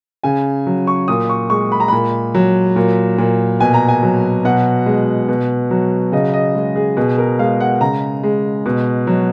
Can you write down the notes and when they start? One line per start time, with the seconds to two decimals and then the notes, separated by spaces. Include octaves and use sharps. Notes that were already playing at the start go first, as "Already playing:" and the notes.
0.23 C#3 G#5
0.67 F#3
0.87 C#6
1.08 A#2 D#6
1.29 C#6
1.50 G#3 C#6
1.72 B5
1.80 A#5
1.88 A#2 B5
2.35 F#3
2.76 A#2
3.18 A#2
3.60 B2 G#5
3.74 A#5
3.88 G#5
4.03 F#3
4.45 B2 F#5
4.86 G#3
5.29 B2
5.71 F#3
6.12 C#3 D#5
6.34 D#5
6.55 G#3
6.76 G#4
6.97 B2 G#4
7.18 A#4
7.39 G#3 F5
7.60 F#5
7.81 C#3 A#5
8.24 G#3
8.66 B2
9.07 F#3